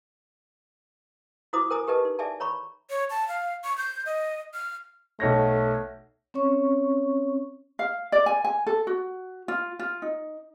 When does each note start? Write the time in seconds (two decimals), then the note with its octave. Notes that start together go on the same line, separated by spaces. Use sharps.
1.53 E4 F#4 C5 A#5 D6 D#6
1.70 A#4 C5 G#5 A#5 D#6
1.87 G4 A#4 B4 D#5 A5
2.05 D#4
2.19 G#4 D5 E5 G#5 A5
2.40 C#5 A#5 B5 C#6
2.90 C#5
3.10 A5
3.28 F5
3.64 C#6
3.78 G6
4.06 D#5
4.54 F6
5.20 B1 A3 C#5 A#6
6.34 C4 C#4 C#5 C#6
7.79 F5
8.12 D5
8.26 G#5
8.44 G#5
8.67 A4
8.87 F#4
9.48 F4
9.79 F4
10.02 D#4